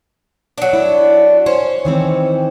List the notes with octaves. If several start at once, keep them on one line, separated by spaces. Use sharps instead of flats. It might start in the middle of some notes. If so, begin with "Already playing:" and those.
F#3 D4
E4
C#4 C5
D#3 E3 C4